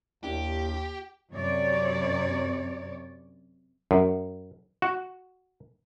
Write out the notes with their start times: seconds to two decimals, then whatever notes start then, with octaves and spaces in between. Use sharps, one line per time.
0.24 D#2 A#3 D4 E4 G4
1.31 F#2 C3 C#5 D5
3.91 F#2
4.82 F#4